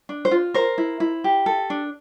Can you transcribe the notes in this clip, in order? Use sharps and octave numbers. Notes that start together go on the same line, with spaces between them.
D4
C5
F4
A#4 C5
E4
E4
G4
A4
D4